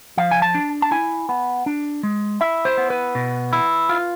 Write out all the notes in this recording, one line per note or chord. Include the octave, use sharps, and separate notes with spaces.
F3 F5
G#5
A5
D4
A5
E4 G#5
B3
D4
G#3
E4 E5
C5
B3
B4
B2
E4
F4